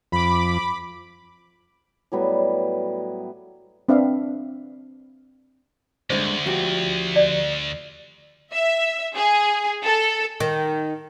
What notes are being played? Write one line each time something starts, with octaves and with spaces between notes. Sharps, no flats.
F2 B5 D6
A2 F#3 G3 B3
C4 D4 B4 E5 F5
D2 G2 D3 G#3 C5
F3 F#4 G4
D5
E5
G#4
A4
D#3